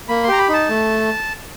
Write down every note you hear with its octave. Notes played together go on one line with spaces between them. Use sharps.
A#3 B5
C6
G4 A#5
B5
D#4 A5
A3